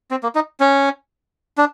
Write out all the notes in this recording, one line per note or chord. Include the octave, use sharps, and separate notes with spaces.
C4
A#3
D#4
C#4
D4